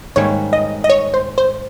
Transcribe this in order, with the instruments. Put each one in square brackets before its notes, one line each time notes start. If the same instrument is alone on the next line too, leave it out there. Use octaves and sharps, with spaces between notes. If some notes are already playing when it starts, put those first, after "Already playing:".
[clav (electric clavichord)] G#2 D#3 G3 A#3 C#4 [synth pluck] C#5
[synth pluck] D#5
D#5
C#5
C5
C5